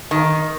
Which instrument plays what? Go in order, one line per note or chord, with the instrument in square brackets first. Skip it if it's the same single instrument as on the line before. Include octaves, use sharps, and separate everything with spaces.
[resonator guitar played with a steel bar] D#3